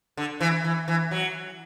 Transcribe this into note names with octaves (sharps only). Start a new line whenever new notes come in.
D3
E3
E3
E3
F#3